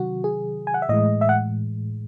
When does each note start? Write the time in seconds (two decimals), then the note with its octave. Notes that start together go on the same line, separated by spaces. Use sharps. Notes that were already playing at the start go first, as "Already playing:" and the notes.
Already playing: C3 D#3 F#3 F#4
0.24 G#4
0.67 G#5
0.74 F#5
0.82 E5
0.89 A2 E3 G#3 D#5
1.21 E5
1.29 F#5